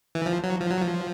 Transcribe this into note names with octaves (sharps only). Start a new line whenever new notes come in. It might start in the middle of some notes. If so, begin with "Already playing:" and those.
E3
F3
F#3
F3
F#3
F3